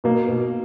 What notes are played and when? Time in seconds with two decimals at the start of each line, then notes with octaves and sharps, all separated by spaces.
0.04 B2 A#3
0.29 B2